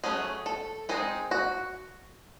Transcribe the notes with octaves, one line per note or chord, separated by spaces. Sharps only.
F#3 A3 C#4 G#4
A4
G#3 C4 D#4 G#4
F#4